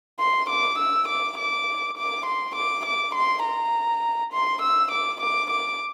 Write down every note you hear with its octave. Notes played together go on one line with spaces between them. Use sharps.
C6
D6
E6
D6
D6
D6
C6
D6
D6
C6
A#5
C6
E6
D6
D6
D6